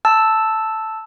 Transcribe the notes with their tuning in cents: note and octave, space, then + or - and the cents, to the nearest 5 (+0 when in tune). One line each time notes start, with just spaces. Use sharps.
A5 +0 E6 -5